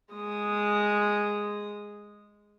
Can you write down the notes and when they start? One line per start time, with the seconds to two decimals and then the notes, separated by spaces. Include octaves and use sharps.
0.13 G#3 D#6